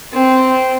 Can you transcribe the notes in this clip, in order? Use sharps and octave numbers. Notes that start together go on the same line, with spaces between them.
C4